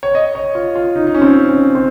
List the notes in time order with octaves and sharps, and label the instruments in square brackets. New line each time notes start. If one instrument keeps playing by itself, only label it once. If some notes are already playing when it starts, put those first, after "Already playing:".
[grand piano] C#5
D#5
C#5
F4
F4
D#4
D#4
C#4
C4
C#4
C4